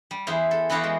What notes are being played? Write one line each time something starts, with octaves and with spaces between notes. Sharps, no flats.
G3
E2 E4 G#4 C5 F5
A4
E3 B3 E4 F#4 G4 F5
G#3